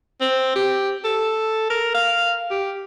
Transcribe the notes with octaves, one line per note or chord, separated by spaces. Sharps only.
C4
G4
A4
A#4
F5
G4